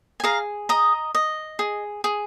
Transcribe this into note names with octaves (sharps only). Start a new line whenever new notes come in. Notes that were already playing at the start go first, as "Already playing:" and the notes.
G#5
G#4 F5 A#5
D#5 A#5 D#6
D#5
G#4
G#4